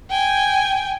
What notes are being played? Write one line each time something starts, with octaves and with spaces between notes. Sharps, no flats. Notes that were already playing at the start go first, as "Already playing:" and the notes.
G5 G#5